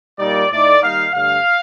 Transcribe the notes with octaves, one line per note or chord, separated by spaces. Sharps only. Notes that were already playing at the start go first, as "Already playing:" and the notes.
A#2 G3 A#3 D#4 D5
A2 A3 D#4 D5
D#3 G3 A#3 D#4 F5
G2 D3 A3 F5